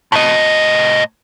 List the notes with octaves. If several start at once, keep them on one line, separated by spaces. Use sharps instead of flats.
A2 D#5